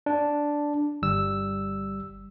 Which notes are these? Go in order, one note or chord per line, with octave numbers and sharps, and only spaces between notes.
D4
G1 G3 E6